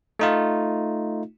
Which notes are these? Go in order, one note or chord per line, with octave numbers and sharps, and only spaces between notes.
A3 D#4 F4